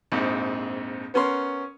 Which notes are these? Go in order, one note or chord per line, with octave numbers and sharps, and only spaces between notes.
A#1 F2 G#2
B3 C#4 A#4 C6